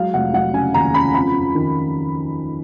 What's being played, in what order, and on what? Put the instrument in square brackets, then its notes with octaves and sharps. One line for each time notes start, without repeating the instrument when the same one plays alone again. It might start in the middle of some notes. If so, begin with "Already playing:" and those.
Already playing: [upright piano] F#3 G#3 F5
F1 F#5
F#3 F#5
C#3 G#5
D#2 A#5
C#3 B5
F2 B5
F2
D#3